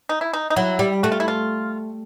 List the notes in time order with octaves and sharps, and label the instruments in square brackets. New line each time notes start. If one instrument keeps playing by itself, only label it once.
[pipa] D#4
E4
D#4
D#4
[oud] F#3 [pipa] E4
[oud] G3
[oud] A3 [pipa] F#4
[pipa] F4
E4
F4